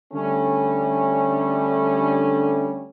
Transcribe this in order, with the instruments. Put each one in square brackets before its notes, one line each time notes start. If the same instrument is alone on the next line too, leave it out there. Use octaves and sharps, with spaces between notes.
[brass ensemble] D3 G3 A3 C#4